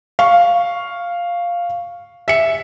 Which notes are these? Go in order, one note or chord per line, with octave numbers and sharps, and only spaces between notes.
F5 C#6
E5 C#7